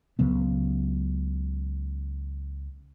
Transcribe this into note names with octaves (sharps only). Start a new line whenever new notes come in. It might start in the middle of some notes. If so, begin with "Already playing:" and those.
C#2 C#3 F#3 B3